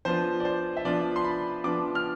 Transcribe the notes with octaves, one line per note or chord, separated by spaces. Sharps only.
F3 B3 D4 F4 C5
D5
C5
E5
F3 B3 D4 F4 D5
C6
B5
F3 B3 D4 F4 D6
F6